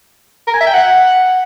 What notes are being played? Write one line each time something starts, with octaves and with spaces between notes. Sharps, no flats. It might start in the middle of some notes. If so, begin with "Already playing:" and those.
A#4
G#5
E5
G5
F#5